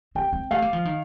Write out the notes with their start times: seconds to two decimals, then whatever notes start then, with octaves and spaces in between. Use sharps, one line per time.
0.15 C4 G5
0.33 C4
0.51 A3 F5
0.62 G3
0.73 F3
0.85 D#3